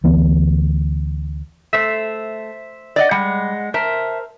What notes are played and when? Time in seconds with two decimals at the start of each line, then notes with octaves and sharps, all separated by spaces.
0.04 D2 E3 B3
1.73 A3 C5 E5
2.96 D5 D#5 F#5
3.11 G3 G#3 F#5
3.74 A#4 C5 E5 A5